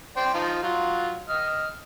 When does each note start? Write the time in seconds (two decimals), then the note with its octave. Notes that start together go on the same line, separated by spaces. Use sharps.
0.17 C5 D5 G5
0.34 F3 D#4 F4
0.63 F#3 F4
1.29 D#5 F6